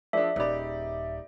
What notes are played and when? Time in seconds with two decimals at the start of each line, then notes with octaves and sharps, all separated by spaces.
0.13 F3 D4 G#4 A#4 D5 E5
0.36 D#1 D#4 G4 C5 D5 D#5 B5